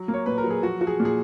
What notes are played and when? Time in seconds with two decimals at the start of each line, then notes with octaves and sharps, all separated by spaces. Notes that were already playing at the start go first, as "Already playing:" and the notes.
Already playing: F#3
0.08 A#3
0.14 C#5
0.26 A#2 B4
0.38 A#4
0.44 F#3
0.51 G#4
0.62 F3 F#4
0.81 F3 F#4
0.87 G#4
1.00 A#2
1.05 G#4